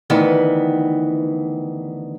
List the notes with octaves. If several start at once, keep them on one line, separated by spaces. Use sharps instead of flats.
D2 D#3 E3 B3